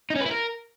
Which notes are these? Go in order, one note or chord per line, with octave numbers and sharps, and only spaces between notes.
D#4
C#4
B4
E4
A#4